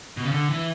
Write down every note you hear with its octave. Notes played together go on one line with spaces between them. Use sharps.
B2
C#3
D3
E3